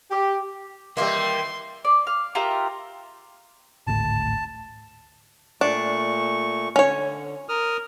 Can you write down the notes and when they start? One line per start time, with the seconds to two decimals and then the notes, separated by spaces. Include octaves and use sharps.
0.11 G4
0.97 D#3 E3 G3 A#3 E5 C6
1.85 D5
2.07 F5
2.35 F4 G4 A#4 E5
3.87 G#1 D2 A2 A5
5.61 A#2 A3 D4 C#6
6.76 D3 C#4 C#5
7.49 A#4 D#6 F6